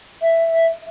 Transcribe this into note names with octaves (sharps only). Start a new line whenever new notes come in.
E5